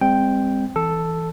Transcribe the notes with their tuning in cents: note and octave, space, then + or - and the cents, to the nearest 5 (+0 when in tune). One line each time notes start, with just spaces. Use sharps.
G#3 -40 C4 +0 G5 +0
E3 -5 A4 +0